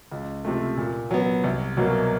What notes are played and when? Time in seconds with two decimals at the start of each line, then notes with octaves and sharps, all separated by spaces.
0.12 C#2
0.45 C3 F3 A3
0.77 A#2
1.11 F#3 B3
1.44 C2
1.77 B2 F#3 A#3